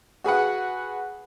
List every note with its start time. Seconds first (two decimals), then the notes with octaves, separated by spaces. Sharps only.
0.24 F#4 G#4 B4 F#5